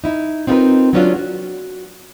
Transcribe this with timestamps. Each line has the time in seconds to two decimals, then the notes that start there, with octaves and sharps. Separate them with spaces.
0.04 D#4 E4
0.47 C4 D#4 F4 G#4 A#4 B4
0.93 F#3 G#3 B3 C#4 D4 F4
1.16 F#4